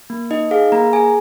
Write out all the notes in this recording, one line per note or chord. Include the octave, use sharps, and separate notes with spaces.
A#3
D#4 D#5
G#4 F5
A#3 A#5
G#4 G#5